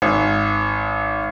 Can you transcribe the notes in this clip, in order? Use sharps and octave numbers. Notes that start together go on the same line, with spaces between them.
G#1